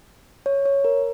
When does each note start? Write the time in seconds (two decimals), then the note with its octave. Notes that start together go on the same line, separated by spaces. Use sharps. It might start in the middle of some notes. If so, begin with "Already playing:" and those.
0.46 C#5
0.66 C#5
0.85 A#4